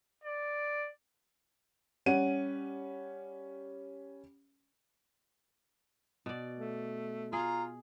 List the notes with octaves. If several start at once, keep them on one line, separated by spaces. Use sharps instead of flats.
D5
G3 C#4 F#5 D#7
B2 D5
A3
F4 G#4 A#5